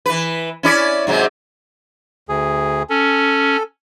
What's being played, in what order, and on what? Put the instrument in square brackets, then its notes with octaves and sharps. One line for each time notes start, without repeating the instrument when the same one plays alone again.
[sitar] E3 B4
C#4 E4 D5
G#2 C3 F#3
[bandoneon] D2 G#4
[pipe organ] C#4 [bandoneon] A4